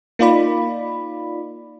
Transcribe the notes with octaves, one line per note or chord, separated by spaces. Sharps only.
A#3 D#4 F4 D5 B5